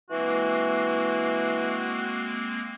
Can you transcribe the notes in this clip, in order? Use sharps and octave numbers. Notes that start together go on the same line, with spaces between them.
E3 G#3 A#3 C4 F#4